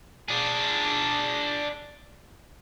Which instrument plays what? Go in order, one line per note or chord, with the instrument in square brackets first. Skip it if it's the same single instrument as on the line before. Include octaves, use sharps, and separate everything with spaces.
[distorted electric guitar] D4 G#4